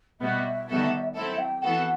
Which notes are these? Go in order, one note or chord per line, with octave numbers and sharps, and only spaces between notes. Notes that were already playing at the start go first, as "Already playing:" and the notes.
B2 G3 B3 F#4 E5
D#3 G3 B3 F#4 A4
F#3 C4 E4 A4 E5
G5
E3 B3 F#4 A4 F#5